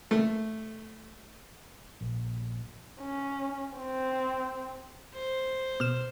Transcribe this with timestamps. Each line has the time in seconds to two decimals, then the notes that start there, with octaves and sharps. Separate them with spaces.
0.11 A3
2.01 A#1
3.01 C#4
3.77 C4
5.14 C5
5.80 B2 F6 E7